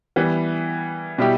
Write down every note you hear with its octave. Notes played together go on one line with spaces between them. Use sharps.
E3 G3 B3
B2 G3 E4 G4